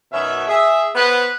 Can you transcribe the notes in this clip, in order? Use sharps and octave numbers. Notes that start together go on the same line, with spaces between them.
F#2 B2 D#3 C#4 E5
G#4 E5
B3 B4 C5